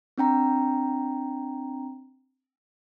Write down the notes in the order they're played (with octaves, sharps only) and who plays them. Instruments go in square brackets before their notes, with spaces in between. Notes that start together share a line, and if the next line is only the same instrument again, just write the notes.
[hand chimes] C4 D4 G5 A#5